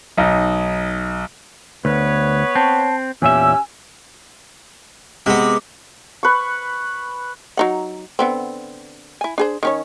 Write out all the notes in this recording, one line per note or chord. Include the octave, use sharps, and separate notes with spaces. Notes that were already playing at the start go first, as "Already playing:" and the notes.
B1 D#4
D2 B3 B4 C#5
C4 A5
E2 A#2 C#4 G4 E5 G#5 E6
C3 G#3 B3 D6
B4 C#6
F#3 D#4 F#5
D3 B3 C4
E4 G#5
D4 G#4 C5
D#3 C#4 C#5